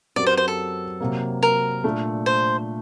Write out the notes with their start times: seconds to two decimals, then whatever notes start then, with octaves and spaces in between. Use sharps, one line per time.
0.16 F#2 F#3 C4 G4 A#4 D5
0.26 C5
0.37 C5
0.48 A4
1.01 C3 F#3 A#3
1.43 A#4
1.84 A#2 A3 D4
2.26 C5